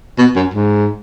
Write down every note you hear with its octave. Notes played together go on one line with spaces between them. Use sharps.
B2
F#2
G#2